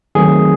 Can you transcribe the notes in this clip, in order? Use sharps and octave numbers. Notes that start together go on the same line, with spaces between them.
D#3 F#3 A3 C4 G#4